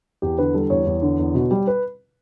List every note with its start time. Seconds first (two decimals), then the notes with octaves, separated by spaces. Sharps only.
0.22 E2 G4
0.38 D3 B4
0.54 G3 A4
0.70 E2 C#5
0.86 E2
1.02 D3
1.19 E2
1.35 B2
1.51 G3
1.67 B4